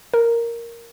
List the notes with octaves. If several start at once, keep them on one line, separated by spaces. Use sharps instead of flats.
A#4